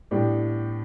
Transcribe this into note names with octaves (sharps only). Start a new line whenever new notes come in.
A2 G3 B3 D4 G4